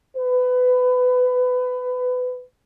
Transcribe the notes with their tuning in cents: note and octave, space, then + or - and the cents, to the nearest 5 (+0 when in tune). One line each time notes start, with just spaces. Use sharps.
B4 +20